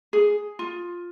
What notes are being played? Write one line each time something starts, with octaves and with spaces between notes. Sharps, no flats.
G#4
F4